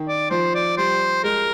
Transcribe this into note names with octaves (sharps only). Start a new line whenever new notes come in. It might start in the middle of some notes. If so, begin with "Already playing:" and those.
Already playing: D#3
D5
F3 C5
D5
G3 C5
G#3 A#4